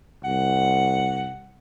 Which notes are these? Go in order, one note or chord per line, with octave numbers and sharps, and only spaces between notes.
C2 F#5